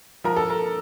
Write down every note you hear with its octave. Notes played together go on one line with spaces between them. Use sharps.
F3 A#4
A4
A#4